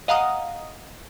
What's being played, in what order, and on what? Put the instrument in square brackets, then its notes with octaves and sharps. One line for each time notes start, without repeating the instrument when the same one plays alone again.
[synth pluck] D#5 F5 F#5 A#5 D#6